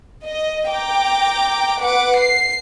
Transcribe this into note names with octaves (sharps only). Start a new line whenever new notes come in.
D#5
G5 A#5 D6
B4 F#5 D6
C7